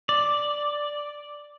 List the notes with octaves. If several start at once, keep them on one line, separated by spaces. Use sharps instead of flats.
D5